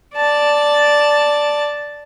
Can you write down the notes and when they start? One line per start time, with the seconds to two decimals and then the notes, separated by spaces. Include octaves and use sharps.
0.16 D5 A5